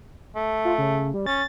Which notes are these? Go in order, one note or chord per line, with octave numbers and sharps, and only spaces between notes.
A3
F4
C#3
G3
C#4 A6